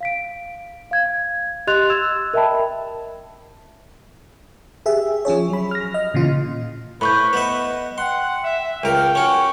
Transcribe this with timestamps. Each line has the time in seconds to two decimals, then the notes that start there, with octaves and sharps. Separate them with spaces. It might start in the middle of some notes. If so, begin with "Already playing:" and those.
0.01 F5 B6 D7
0.91 F5 G#6
1.67 G4 D#5 C6 F#6 A6 F7
1.90 E6 G#6 E7
2.34 A#4 D#5 E5 G5 A5 B5
4.86 G4 G#4 E5
5.25 F3 C#4 G#4 C#5
5.50 F#3 B5
5.71 F6 A#6
5.94 D#5 F6
6.14 A#2 C#3 E3 F4
7.01 A2 B4 C5 B5 C#6 G6
7.33 B3 D#5 E5
7.98 F#5 G5 C6
8.43 E5
8.83 C#2 A#4 G5 F6
9.15 C#4 F#4 G#5